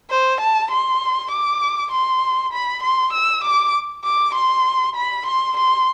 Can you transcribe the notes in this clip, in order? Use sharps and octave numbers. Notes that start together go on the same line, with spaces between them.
C5
A5
C6
D6
C6
B5
C6
E6
D6
D6
C6
B5
C6
C6